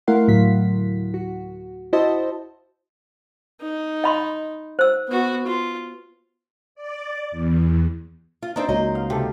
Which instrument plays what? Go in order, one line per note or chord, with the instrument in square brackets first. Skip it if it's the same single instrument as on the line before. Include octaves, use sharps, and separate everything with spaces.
[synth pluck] A3 E4 A#4 F5 F#5 C6
D2 A2 F#3 B6
F#4
E4 F#4 C5 D#5 E5 A5
[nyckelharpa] D#4
[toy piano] D#5 B5 C6
C5 E6
[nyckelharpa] B3 F#4
F4
[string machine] D5
E2
[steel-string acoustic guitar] F4
[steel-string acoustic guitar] C4 D4 [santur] D#4 C5
[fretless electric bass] C#2 A#3 [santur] F#3 [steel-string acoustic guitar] D#5
[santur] F5
[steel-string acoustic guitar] C3 [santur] G4 A4